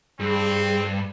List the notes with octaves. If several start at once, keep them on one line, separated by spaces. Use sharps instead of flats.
G2 C4 G#4